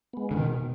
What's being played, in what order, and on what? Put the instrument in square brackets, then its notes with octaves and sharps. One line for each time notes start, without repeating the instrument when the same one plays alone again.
[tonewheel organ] G#3 B3
[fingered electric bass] D3
[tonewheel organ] B2 [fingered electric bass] D#3